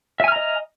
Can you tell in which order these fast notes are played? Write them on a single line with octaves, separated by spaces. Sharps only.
E5 G#5 F6 A#5 D#5